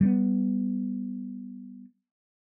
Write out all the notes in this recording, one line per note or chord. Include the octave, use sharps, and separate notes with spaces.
G3 G#3 B3